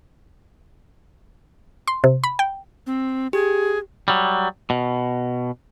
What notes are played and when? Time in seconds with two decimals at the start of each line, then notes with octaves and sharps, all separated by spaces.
1.88 C6
2.04 C3
2.24 B5
2.39 G5
2.87 C4
3.33 G4 G#4
4.08 F#3 G3
4.70 B2